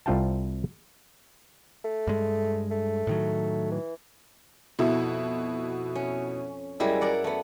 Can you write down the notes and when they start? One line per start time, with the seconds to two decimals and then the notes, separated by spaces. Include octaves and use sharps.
0.06 C2 C4 F4 F5 G5 A5
1.85 A3
2.07 G2 G#3
2.71 A3
3.07 A2 D#3 F#3
3.72 E3
4.79 F2 B2 E4 F#4
5.95 C#4
6.80 F#2 G3 G#3 E4
7.01 A#4 D5 F#5
7.24 A3 B3